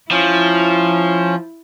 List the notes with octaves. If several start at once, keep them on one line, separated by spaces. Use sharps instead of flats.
F3 C#4 E4